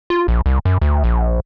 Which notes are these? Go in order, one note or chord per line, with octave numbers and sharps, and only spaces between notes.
F4
A#1
C2
F#2
D2
A#1